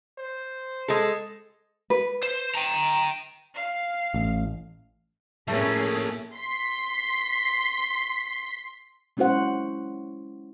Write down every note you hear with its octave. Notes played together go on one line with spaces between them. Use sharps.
C5
G#3 A4
B4
C5
G5 A#5
F5
A1
A2 F3 A3 A#3 C#4 G#4 A4
C6 B6
G#3 C#4 E4 F#4 C5 F#5